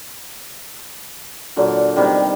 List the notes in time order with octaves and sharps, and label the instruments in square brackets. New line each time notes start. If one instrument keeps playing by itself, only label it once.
[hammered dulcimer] A#2 D3 F#3
C3 D#3 G3 B3